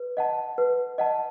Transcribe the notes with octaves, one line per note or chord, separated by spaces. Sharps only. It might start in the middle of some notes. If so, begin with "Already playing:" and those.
Already playing: B4
D#5 F#5 A5
B4
D#5 F#5 A5